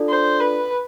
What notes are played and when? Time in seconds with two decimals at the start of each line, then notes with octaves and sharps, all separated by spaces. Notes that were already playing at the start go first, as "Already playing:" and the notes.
Already playing: D4 F4 A4 D5
0.09 C5
0.40 B4